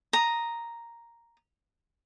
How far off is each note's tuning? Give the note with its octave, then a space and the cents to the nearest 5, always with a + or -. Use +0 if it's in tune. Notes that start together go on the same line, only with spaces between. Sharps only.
A#5 +0 D#6 +0